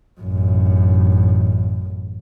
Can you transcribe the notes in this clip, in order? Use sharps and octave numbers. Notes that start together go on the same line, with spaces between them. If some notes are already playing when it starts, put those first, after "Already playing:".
A1 F#2